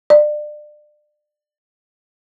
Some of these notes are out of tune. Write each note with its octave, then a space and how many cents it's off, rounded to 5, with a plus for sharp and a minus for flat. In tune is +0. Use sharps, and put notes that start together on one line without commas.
D5 +30